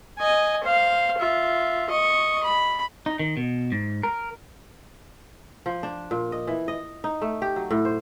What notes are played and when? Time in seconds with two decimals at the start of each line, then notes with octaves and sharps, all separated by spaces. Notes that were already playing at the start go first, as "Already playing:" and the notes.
0.19 D#5 G#5
0.63 C5 F5
1.18 F4 E5
1.90 D#5 C#6
2.43 B5
3.06 D#4
3.19 D#3
3.37 B2
3.72 G#2
4.03 A#4
5.66 F3
5.83 D4
6.11 A#2
6.32 D#5
6.47 E3
6.68 D#5
7.04 D#4
7.21 A3
7.42 G4
7.56 F#3
7.71 A2
7.85 C5